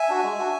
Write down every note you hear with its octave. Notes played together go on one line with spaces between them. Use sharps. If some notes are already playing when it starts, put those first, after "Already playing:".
Already playing: E5 G#5
D4 F#4
G#3
D4 F#4